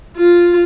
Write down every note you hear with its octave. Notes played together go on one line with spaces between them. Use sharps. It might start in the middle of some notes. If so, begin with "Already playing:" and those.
F4